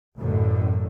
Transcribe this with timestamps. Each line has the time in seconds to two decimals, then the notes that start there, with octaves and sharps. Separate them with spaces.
0.17 A1 F#2 A2 D3